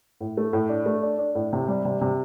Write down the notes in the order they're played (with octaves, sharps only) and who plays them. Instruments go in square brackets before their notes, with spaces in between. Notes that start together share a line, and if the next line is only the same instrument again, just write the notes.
[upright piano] A2
A3
A2
D4
A3
D4
D4
A2
C3
G3
C3
C3